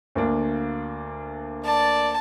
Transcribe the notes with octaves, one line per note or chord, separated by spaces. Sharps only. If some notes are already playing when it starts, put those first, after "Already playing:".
D2 A#3 D4
D5 A5